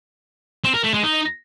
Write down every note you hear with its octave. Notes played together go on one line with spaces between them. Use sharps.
C4
A#4
A3
G#3
D#4